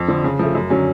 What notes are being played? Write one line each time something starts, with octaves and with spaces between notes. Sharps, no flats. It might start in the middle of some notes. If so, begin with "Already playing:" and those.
Already playing: F2
D3 F3
C#3
F3 A3
F#2
D3 F#3 C#4